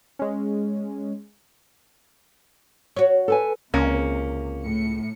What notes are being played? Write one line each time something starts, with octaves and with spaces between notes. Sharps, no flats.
G#3 C#4
F#4 C#5
A4 B4 G#5
C#2 C3 A#3 C#4
A2 C#7